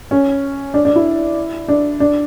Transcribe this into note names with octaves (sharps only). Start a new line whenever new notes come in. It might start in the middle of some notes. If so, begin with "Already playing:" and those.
C#4
D4
D4
E4
D4
D4